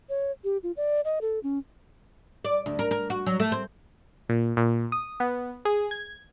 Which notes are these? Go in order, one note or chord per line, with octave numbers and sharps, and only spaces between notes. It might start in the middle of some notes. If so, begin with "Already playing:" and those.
C#5
G4
F4
D5
D#5
A4
C#4
D5
D2
A#4
A#4
F#4
F#3
A3
C4
A#2
A#2
D#6
B3
G#4
G#6